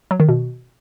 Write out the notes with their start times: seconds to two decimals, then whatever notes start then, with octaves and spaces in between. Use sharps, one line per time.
0.11 F#3
0.20 D#3
0.29 B2